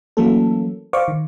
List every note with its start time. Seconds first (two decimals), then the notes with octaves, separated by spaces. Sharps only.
0.17 E3 F#3 A3 A#3 C#4 A4
0.93 C5 D5 F5 C#6 D6
1.08 D#3